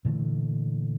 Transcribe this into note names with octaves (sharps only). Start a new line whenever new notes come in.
A#2 D3 E3 A3